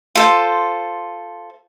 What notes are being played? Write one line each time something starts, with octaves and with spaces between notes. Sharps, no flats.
F4 A4 C5